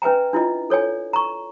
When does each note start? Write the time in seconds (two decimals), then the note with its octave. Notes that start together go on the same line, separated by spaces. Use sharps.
0.02 C#4 B4 E5 G#5 A#5
0.33 D4 E4 F4 D#5
0.70 A4 C#5 D5 G#5
1.13 A#5 C#6